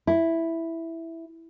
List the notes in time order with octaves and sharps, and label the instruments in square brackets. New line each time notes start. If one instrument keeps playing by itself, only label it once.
[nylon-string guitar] E4